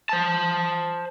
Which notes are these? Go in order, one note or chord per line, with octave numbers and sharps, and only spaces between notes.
C5 A5